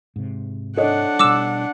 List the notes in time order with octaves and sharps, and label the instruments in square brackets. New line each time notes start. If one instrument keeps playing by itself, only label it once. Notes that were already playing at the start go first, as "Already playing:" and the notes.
[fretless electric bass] G#2 C3
[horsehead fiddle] D4 F#5 [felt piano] A4 C#5 D#5
[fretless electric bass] B2 G3 [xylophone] D6 E6 E7